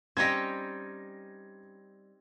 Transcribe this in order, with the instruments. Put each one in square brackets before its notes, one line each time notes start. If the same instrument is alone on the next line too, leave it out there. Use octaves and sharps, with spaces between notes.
[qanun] G3 C#4 [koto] C4 D#4 G4 [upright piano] G#6 A#6